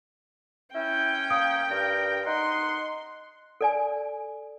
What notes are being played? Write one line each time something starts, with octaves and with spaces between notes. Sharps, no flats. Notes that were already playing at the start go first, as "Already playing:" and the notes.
C#4 E4 G5 G6
A#3 D#6
G2 A#4
D#4 F#5 C6
A4 D5 G#5